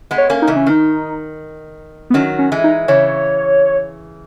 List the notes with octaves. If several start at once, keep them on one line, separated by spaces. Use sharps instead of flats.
G#3 B3
C#5
A#3 C#4
D#4
C#3 E3
C#4
D#3 D#4
B3
D#3 F#3 C#4
C#4
E3 G#3
D#4
C#3 E3 C#5